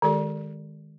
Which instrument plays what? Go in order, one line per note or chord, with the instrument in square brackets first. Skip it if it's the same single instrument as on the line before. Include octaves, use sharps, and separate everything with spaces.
[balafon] D#3 G#3 G4 A4 D5